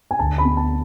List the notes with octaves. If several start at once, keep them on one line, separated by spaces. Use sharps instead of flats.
G#5
D2 A5
B5
B3
A5